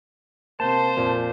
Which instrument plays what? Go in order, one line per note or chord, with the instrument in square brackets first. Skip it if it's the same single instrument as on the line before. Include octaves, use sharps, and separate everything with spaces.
[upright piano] C3 A#3 [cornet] C5 [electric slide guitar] A5
[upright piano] F2 A#2